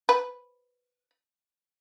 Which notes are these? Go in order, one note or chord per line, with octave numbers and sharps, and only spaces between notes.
B4